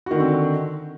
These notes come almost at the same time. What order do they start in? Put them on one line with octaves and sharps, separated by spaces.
F#4 D#3 D3 C4